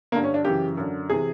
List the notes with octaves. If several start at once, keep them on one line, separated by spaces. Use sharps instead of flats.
G2 D3 A#3
C#4
D4
F#2 C#3 E3 G4
F#2 D3
C3 E3 G#4